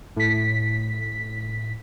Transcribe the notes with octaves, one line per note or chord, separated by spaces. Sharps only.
A2 B6